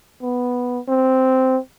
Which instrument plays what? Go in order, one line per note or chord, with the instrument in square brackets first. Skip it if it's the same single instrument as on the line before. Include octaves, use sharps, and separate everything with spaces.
[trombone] B3
C4